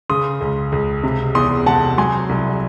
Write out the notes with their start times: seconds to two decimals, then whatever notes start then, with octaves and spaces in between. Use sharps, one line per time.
0.10 C#3 C6 D#6
0.41 C#2
0.72 C#2
1.03 C3
1.35 E2 C6 D#6
1.66 C3 F#5 A5
1.98 F#3 G#5 C6
2.29 C2